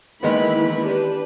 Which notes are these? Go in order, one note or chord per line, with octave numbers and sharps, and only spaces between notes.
D#3 E3 G#3 A#3 B3 B5
D4 G4 B4